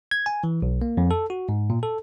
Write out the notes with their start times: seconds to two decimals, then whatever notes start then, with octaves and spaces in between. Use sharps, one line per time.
0.11 G#6
0.26 G#5
0.44 E3
0.62 B1
0.82 A#3
0.97 F2
1.11 A4
1.30 F#4
1.49 G#2
1.70 A#2
1.83 A4